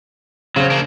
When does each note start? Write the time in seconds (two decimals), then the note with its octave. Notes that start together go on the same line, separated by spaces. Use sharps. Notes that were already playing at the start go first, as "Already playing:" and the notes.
0.56 C#3 F#3 C5
0.70 A#3 D4